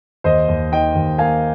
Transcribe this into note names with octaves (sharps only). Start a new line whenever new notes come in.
D#2 C5 D#5
D#2
D#3 D#5 G5
D#2
A#3 F5 G#5